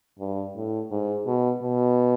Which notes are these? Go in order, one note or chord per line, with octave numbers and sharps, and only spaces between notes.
G2
A2
G#2
B2
B2